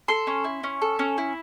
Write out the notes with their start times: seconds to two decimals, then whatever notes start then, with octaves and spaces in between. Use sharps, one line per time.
0.08 A4 C6
0.27 C#4
0.44 E4
0.63 C#4
0.82 A4
0.99 C#4
1.18 E4